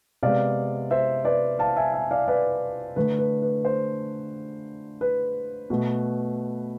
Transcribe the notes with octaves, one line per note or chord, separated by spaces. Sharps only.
C3 G#3 B3 D5 F5
C5 E5
B4 D5
F5 A5
E5 G#5
E5 G#5
D5 F5
B4 D5
D3 A3 B4
B4
B4
C5
B4
B2 A3